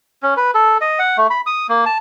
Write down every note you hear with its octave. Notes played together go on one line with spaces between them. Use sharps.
C#4
B4
A4
D#5
F#5
A3
B5
D#6
A#3
A5